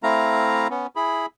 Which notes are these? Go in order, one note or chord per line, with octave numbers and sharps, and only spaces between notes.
A3 C4 E4 F5 A#5
B3 C#4
E4 G#4 B5